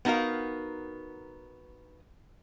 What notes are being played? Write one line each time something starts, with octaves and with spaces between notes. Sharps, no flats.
B3 D#4 F#4 A#4 F5